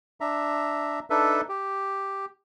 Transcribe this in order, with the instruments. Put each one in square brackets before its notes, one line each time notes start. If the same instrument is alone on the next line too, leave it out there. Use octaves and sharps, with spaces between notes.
[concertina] D4 E5 A#5
D4 D#4 A4 B4 E5
G4